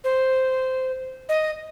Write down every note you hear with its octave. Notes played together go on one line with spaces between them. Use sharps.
C5
D#5